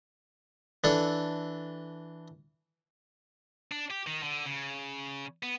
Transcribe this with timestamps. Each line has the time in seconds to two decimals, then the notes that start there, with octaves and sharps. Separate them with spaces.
0.84 E3 D4 A4
3.72 D4
3.91 G4
4.07 D#3
4.23 D3
4.46 C#3
5.43 B3